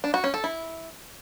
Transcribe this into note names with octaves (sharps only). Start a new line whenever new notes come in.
D4
F#4
C#4
A4
E4